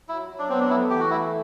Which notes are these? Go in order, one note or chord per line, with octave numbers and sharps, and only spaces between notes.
F#3 E4
F#3
D4
B3 C4
D4
A3 E4
E3 G4
F#4
A3 E4